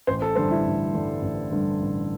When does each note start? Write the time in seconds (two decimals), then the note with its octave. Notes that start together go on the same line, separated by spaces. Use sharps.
0.07 A1 C5
0.22 A4
0.35 G2 D3 G3 C5
0.51 E4
0.65 A1
0.94 G2 D3 G3
1.22 A1
1.52 G2 D3 G3
1.80 A1